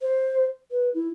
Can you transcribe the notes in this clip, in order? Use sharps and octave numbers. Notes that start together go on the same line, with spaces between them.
C5
B4
E4